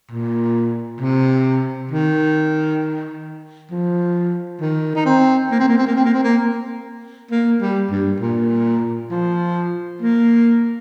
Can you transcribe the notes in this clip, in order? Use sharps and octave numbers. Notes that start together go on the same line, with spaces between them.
A#2
C3
D#3
F3
D#3
D#4
C4
A#3
C4
A#3
C4
A#3
C4
A#3
C4
A#3
A#3
G3
G2
A#2
F3
A#3